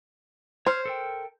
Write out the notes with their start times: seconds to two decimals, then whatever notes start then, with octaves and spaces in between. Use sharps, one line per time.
0.66 C5 C#5 F6
0.85 A4 A#4 G5